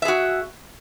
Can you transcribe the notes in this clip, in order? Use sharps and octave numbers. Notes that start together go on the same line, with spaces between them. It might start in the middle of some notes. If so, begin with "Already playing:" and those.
F#4 G#4 E5